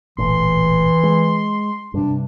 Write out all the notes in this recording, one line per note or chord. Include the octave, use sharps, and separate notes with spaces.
E1 A#1 A2 E3 C6
G#3
G2 C3 D4